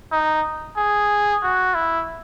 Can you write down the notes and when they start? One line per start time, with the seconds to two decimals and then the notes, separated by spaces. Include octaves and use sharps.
0.12 D#4
0.77 G#4
1.43 F#4
1.75 E4